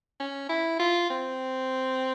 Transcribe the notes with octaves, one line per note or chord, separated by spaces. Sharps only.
C#4
E4
F4
C4